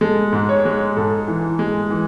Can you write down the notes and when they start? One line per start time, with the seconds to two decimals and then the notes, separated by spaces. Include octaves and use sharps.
0.01 G#3 A4
0.32 G#2
0.49 C#5
0.65 G#3
0.97 G#2 A4
1.28 E3
1.59 G#3
1.90 E3